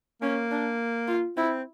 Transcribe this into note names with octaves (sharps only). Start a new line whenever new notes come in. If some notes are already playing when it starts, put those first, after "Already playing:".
A#3 C#4
D4
F4
C4 E4